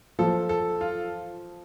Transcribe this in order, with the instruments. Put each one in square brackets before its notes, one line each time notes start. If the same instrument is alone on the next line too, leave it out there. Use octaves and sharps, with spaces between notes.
[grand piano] F3 [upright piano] A4
[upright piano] A4
F4